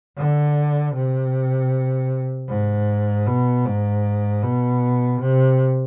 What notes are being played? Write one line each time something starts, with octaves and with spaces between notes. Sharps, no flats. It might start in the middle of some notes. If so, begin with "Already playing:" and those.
D3
C3
G#2
B2
G#2
B2
C3